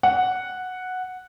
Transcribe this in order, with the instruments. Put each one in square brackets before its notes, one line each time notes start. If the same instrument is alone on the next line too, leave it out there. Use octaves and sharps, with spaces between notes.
[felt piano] F#5